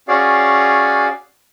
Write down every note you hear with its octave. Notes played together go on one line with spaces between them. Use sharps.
C#4 F#4 G#4 D5 F5